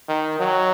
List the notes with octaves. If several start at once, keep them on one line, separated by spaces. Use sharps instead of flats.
D#3
F#3